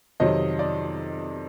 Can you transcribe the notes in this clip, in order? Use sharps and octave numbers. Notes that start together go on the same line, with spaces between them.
F2 C3 D#3 F#3 D#5
D5